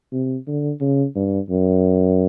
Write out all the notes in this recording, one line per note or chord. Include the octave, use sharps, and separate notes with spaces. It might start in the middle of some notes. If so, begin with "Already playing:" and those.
C3
D3
C#3
G2
F#2